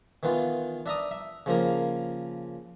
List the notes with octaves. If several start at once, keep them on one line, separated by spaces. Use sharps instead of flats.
D#3 E3 B3 F4
D4 E5 A#5 D#6
E5
C#3 F3 A#3 A#4